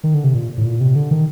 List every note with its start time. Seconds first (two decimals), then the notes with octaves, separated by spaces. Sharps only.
0.04 D#3
0.14 D3
0.24 C3
0.35 A#2
0.58 A2
0.65 A#2
0.81 C3
0.96 D3
1.11 D#3